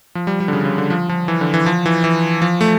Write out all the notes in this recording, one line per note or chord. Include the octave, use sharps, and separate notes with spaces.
F3
G3
G3
D3
C#3
C#3
D3
F3
F3
E3
D3
E3
F3
E3
E3
F3
A3